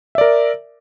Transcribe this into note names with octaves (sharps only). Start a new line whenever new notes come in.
A#4 D5 E5